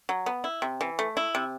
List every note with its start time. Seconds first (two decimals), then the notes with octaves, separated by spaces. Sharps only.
0.09 F#3
0.26 B3
0.44 E4
0.62 C3
0.81 E3
0.99 A3
1.17 E4
1.35 C3